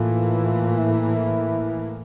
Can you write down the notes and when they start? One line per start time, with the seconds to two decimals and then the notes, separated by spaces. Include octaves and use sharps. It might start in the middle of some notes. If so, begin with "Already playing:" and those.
Already playing: A2 E3 A#3 F4
0.79 E4